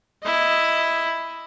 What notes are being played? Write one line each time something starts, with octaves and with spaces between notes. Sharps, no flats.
E4 D#5